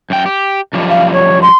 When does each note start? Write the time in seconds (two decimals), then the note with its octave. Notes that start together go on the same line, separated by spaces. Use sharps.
0.10 F#2 G5
0.26 G4
0.73 F#2 F3 G3
0.90 F5
1.12 C#5
1.42 C6